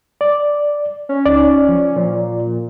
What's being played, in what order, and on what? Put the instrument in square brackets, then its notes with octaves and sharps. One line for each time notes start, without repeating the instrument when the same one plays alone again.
[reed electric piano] D5
[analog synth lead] C#4
[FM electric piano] C#2 D#4 [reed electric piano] D5
[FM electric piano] F3
[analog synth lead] A#2 [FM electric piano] F3